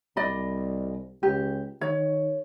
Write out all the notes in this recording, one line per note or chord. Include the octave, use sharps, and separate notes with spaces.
C2 D5 D#5 B5
C#2 G4
D#3 C#5